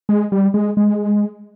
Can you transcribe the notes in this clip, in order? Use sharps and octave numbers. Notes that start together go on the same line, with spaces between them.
G#3
G3
G#3
G#3